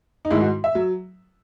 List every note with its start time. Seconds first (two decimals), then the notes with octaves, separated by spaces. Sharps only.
0.25 D#4
0.30 G#2 D#3 G#3 E4
0.41 F#4
0.64 E5
0.75 F#3